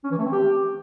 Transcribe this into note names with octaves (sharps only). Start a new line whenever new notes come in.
C#4
E3
A3
C4
G4